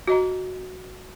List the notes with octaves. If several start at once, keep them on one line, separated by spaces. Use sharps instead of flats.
F#4 D#5 A#5